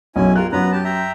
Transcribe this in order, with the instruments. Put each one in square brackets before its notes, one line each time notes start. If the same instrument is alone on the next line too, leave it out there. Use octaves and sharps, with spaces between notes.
[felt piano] B1 F#2 [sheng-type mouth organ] C#4 E4 G#5
[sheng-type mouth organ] F4 A#4 [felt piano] G4 F#6
[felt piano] F#2 [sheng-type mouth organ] B3 B4 A#5
[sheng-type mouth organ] G4 A5
E5 G5 A#5